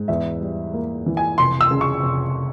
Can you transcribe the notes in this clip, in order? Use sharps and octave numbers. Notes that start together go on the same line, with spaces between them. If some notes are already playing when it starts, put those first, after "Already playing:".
Already playing: G#2
E2 E5
G3
A#3
E3
G#5
F1 C6
E6
C#3
C#6
F1